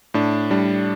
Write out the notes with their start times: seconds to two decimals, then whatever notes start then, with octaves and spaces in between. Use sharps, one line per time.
0.14 A2 D4
0.51 G3 D4